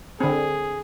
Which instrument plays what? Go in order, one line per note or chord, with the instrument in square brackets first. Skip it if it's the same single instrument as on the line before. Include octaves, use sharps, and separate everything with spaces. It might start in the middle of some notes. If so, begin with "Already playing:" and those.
[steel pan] D3 C4 [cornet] G#4